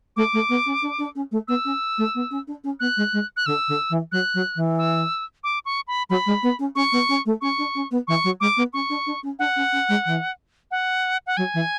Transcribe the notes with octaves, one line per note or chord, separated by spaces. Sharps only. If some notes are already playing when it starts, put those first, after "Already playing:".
A3 D6
A3
B3
C#4
D4
D4
C#4
A3
B3 E6
C#4
A3
B3
C#4
D4
C#4
B3 F#6
G#3
G#3
F#6
D3 E6
D3
E3
F#3 F#6
F#3
E3
E6
D6
C#6
B5
F#3 B5
G#3
B3
C#4
C#4 C#6
B3
C#4
A3
C#4 C#6
D4
C#4
B3
E3 C#6
F#3
G#3 D6
B3
C#4 C#6
D4
D4
C#4
D4 F#5
C#4
C#4
G#3
E3
F#5
F#5
F#3 G#5
E3